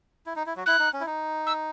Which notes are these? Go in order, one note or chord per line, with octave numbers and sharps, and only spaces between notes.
E4
D#4
E4
F#3 F#4
E4 F#6
D#4
C#4
E4
D#4
E6